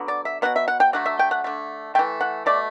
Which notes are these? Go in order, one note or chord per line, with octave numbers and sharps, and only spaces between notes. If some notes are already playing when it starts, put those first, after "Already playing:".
Already playing: D3 F#3 B3
D5
E5
B2 F#3 B3 F#5
E5
F#5
G5
D3 F#3 A3 F#5
E5
G5
F#5
D3 A3
E3 A3 G5
F#5
B2 A3 D5